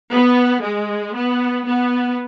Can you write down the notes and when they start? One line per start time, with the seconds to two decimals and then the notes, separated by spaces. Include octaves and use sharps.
0.12 B3
0.63 G#3
1.15 B3
1.66 B3